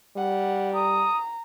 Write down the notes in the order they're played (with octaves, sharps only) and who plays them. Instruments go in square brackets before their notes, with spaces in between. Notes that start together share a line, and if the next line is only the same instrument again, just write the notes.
[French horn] G3 [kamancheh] F#5
[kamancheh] A#5 [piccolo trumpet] D#6